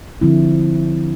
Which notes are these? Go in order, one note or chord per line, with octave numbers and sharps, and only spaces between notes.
D3 F3 C4 E4